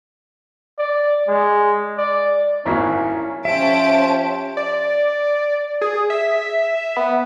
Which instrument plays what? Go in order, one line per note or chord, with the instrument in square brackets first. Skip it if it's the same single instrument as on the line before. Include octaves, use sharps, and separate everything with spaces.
[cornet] D5
G#3
D5
[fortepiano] G#1 A#3 F#4 [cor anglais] C#4 [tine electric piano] E4 [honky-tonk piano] A#5 G#6 B6
[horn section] F3 G4 C5 [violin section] C#4 A5 D7 [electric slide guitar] E5
[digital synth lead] D5
G#4
E5
B3